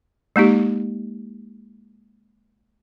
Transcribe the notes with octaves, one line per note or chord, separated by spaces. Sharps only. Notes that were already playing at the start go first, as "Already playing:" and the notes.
G#3 A#3 D#4 G4